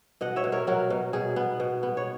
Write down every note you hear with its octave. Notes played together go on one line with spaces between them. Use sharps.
B2 D#5 F#5
C#5 E5
B2
A#4 C#5
F#3 F#4 A#4
B2
B2 G#4
B3
B2
B3
C#5